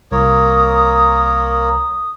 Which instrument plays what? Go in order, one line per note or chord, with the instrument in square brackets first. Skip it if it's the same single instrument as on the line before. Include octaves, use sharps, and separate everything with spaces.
[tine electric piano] C2 [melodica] A#3 A#4 C#5 [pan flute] D#6